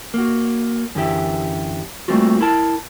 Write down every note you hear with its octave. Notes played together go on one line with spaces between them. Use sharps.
A#3 F#4
F#2 D3 E3 G4 E5
G3 A3 A#3 C4 F4 F#4
E4 A#4 A5